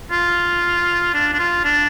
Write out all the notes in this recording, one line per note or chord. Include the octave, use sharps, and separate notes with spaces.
F4
D4
D4
F4
D4